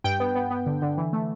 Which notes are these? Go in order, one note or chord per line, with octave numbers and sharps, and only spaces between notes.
G2 G5
B3
B3
B3
D3
D3
E3
A3